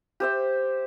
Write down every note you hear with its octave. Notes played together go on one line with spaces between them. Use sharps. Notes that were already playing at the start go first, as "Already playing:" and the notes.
G4 C5 E5